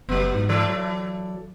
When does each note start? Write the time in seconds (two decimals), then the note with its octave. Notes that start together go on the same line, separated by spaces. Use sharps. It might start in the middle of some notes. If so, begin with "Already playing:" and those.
0.09 F#1 F#3 B3
0.35 G#2
0.49 E3 A4 D5
0.69 F#3